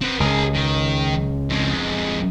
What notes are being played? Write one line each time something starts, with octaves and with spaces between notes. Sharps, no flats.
C4 B4
C#2 G#4 A#4
D#3
F2 G#3